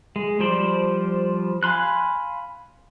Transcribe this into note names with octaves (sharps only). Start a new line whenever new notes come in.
G#3
F3 G3 C5 D5
F5 G#5 B5 C6 F#6